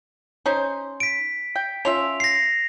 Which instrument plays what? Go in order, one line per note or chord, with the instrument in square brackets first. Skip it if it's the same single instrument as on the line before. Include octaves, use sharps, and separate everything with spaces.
[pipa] C#4 D#4 C5
[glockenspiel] B6 D7
[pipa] G5
[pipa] C#4 F4 E5 [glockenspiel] F7
[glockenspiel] A#6 C7